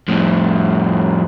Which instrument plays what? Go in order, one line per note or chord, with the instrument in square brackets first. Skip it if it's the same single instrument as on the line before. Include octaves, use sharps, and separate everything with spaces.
[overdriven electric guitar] F2 A2